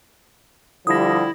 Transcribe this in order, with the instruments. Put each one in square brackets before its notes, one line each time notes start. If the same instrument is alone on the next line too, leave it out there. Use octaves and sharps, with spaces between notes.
[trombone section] D3 F3 G3 [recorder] E4 [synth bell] D#6 A#6